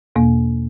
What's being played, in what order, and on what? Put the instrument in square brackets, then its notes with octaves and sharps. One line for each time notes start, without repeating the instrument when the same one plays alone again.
[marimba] E2 B2 A#3